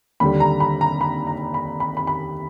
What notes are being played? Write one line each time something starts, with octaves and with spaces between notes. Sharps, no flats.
D#2 D3 G3 B5
A#5
B5
A#5
B5
A#5
B5
B5
B5
B5